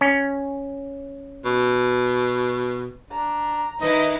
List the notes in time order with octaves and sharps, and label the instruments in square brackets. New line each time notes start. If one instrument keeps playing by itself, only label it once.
[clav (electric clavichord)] C#4
[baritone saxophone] B2
[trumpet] D4 [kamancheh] A#5
[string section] D#3 D#4 E4 [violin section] B4 [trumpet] D#5